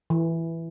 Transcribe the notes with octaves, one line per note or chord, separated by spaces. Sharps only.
E3